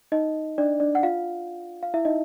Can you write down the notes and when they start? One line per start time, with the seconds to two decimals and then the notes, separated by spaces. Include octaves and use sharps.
0.12 D#4 D#5
0.58 D4 D5
0.80 D4 D5
0.95 F#5
1.03 F4 F5
1.83 F5
1.94 E4 E5
2.05 D#4 D#5